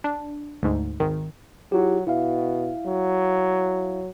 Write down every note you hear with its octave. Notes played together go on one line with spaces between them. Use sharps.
D4
D2 G#2
G#1 D#3
F#3 E4 F4 G4
B2 E4 E5 F5
F#3